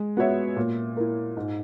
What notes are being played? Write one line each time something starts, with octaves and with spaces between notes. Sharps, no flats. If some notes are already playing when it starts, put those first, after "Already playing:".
Already playing: G#3
B3 F#4 C#5 E5
A#2
A#3 E4
G#2